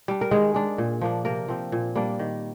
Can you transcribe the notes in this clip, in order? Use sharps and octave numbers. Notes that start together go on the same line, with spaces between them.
G3 D4
A#4
D#3 G#3 G#4
G#3 D4
A#2
F3 A#3 D4
C3 A#3 A#4
F3 C4
A#2
G3 A#3 D4
D#3